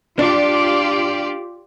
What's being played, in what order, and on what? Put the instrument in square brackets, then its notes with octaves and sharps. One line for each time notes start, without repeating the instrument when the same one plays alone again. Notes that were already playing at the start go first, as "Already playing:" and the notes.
[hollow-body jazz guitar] D4 [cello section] F4 G4 D5